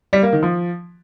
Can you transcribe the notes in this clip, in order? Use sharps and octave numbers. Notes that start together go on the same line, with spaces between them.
G3
A#3
D#3
F3